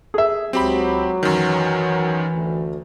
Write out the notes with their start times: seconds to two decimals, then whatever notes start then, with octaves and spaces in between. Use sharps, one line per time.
0.14 G#4 E5
0.53 C#2 F#3 C4 G4 B5
1.23 F#2 D#3 E3
2.33 D2